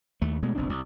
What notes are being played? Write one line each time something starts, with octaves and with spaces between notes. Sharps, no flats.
D#2 A3
B2 G#3 A3 B3
F#1 B1 C4 D4
C2